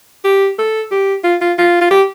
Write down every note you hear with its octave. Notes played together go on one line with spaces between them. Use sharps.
G4
A4
G4
F4
F4
F4
F4
G4